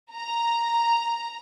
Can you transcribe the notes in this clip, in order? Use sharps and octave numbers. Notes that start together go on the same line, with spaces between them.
A#5